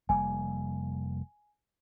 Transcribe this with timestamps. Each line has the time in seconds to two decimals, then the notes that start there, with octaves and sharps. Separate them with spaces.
0.09 F1 G3 A#3 G#5